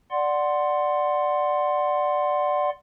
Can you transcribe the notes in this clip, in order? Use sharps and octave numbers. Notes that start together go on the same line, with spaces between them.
D5 F#5 C6